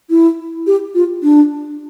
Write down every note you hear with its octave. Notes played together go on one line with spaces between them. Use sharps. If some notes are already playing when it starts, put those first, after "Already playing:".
E4
G4
F4
D4